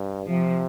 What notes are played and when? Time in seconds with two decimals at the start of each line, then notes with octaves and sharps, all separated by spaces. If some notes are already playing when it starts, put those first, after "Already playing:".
Already playing: G2
0.28 C3 F3